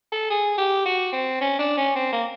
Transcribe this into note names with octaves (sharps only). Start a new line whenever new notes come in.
A4
G#4
G4
F#4
C4
C#4
D4
C#4
C4
A#3